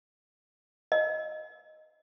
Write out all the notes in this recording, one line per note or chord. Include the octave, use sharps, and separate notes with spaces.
D#5